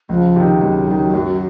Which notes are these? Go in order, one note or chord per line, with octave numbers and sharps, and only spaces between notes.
C#2 F3
C3 D#3
C#2 F#3
C3 D#3
F#2